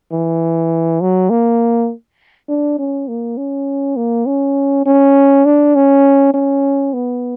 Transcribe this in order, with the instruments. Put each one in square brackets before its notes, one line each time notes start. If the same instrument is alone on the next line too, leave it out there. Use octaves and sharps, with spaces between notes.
[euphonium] E3
F#3
A#3
D4
C#4
A#3
C#4
A#3
C#4
C#4
D4
C#4
C#4
B3